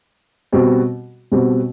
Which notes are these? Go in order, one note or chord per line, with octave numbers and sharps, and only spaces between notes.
B2 G3 C4 F#4
B2 G3 C4 F#4